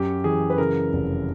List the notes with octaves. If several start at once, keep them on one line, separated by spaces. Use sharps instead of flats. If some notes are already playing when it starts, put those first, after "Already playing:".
Already playing: F#2 G4
E3 G#4
B4
C#3 A#4
F1